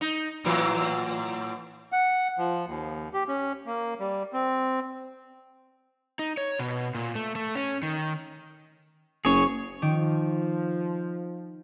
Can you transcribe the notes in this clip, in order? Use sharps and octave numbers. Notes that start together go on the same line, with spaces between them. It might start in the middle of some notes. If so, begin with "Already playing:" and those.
D#4
A2 E3 F#3
F#5
F3
D#2
G4
C#4
A#3
G3
C4
D#4
C#5
B2
A#2
A3
A3
C#4
D#3
F#1 G#4 C#5
D#3 F3 D6